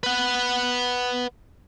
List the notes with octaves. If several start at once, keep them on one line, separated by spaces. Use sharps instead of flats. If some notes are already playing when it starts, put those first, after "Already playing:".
B4 F#5